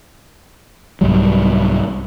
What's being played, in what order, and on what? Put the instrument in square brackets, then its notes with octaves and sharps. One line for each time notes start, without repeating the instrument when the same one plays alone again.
[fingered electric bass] C2 G#2 F#3 G3